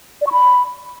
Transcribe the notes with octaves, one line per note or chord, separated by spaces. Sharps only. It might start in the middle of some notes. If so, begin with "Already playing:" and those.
D5
C#6
B5